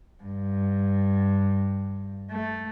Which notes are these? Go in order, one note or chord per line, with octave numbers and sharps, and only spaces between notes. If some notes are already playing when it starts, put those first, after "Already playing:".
G2
A3